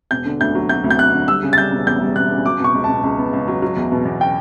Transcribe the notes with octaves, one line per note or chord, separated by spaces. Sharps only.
E1 G6
D3
D2 G6
F#3
F#3 G6
D2
G6
F#3 F#6
D3
G3 E6
C#3
A6
G3 G6
E1
E2 G6
G3
E1 F#6
C#3
F#3 D6
B2 C#6
C#2
A5
B2
C#2
B3
C#2
F#3
F#3
E2
B2
E2
G5